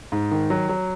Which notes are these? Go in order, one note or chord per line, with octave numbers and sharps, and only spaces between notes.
G#2
D#3
F#3
F#3